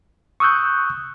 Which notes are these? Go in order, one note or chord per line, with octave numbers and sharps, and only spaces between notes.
C#6 D#6 E6 F#6 G6